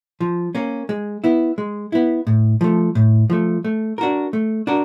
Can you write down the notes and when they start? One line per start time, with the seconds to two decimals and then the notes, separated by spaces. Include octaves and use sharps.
0.20 F3
0.55 A#3 C#4
0.89 G#3
1.24 B3 E4
1.58 G#3
1.92 B3 E4
2.27 A2
2.61 F3 A3
2.95 A2
3.30 F3 A3
3.64 A3
3.98 D4 F#4 A#4
4.33 A3
4.67 D4 F#4 A#4